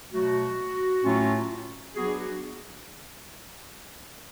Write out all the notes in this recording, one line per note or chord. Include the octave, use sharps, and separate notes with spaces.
B2 F#3 A3 F#4
A2 F#3 A3 C#4 F4
F#3 B3 D4 F#4 G#4
F#4 G#4